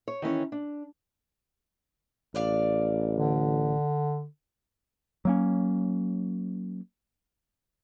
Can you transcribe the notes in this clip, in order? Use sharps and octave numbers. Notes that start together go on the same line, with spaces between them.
C#5
D#3 E3 C#4 C#5
D4
A1 D4 D5 F5
D3
F#3 A#3 C#4